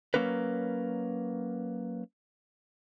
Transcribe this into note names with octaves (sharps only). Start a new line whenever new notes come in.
F#3 G#3 A#3 C#4 A#4 B4